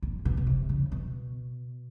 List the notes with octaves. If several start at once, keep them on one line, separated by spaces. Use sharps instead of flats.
A#2
B2
B2
C3
C#3
B2